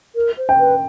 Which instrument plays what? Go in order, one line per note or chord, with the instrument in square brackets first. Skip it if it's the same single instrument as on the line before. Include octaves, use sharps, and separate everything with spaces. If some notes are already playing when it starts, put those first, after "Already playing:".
[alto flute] A#4
C5
[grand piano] G5
[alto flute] B4